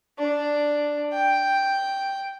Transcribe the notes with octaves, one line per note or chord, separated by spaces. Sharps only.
D4
G5